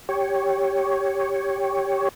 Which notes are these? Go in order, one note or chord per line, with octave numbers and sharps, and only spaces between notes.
G4 C#5